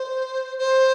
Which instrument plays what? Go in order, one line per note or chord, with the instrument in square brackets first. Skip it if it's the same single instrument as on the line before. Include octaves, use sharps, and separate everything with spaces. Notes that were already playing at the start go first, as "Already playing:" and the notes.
Already playing: [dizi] C5
C5